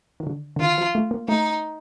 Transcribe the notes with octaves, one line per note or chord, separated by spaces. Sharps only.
D#3
D3
D3
D#3 F4
F3
A3
A#3
A3 D#4